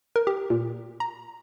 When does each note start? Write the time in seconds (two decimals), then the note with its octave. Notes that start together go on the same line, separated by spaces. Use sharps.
0.16 A#4
0.27 G4
0.50 A#2
1.00 A#5